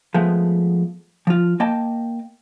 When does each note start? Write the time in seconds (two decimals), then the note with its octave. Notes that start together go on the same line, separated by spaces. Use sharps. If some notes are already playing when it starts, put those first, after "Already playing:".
0.14 F3 G#3 A3 B3
1.27 F3 F4
1.60 A#3 D#5 G5 A5